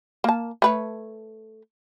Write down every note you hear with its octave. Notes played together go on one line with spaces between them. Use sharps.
A#3 A5
A3 B4 C#5